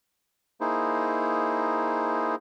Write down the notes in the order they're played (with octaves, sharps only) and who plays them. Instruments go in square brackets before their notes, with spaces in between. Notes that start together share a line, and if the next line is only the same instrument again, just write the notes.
[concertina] A#3 D#4 E4 G#4 C5